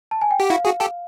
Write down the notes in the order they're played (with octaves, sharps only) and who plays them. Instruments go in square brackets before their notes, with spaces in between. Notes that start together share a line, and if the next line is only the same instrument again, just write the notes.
[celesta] A5
G#5
G5
[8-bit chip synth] G4 [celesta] F#5
[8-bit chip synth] E4 F#4 [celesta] F5
[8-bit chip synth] F#4 G#4
G4 A4